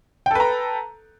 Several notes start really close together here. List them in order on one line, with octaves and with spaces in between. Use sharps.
G5 A4 B4 A#5